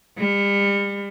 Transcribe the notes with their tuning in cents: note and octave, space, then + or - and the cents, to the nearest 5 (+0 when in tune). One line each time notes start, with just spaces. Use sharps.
G3 +40